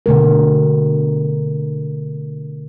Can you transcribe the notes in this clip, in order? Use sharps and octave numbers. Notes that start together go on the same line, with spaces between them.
B2 D3 A3 A#4